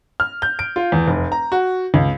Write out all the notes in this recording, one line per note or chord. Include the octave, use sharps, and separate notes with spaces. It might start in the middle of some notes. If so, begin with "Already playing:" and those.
F6
G6
D7
F4
E2
F1
A#5
F#4
C#2